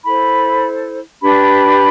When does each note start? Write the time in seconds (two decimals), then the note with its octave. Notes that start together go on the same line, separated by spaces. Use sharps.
0.05 E4 A4 C5 B5
1.22 D4 G4 B4 B5